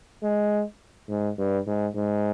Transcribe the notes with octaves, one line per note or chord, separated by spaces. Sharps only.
G#3
G#2
G2
G#2
G#2